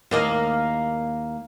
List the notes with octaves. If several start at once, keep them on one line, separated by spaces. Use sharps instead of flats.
D#2 A#3 D#5